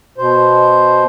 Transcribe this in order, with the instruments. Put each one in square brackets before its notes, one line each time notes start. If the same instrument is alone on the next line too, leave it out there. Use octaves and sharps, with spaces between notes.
[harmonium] B2 C5